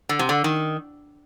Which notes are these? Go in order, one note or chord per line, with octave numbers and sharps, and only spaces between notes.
D3
C3
D3
D#3